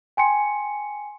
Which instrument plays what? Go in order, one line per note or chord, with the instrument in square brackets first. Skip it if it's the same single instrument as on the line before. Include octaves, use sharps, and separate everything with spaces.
[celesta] G5 G#5 C6 C#7